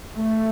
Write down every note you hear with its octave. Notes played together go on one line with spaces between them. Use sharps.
A3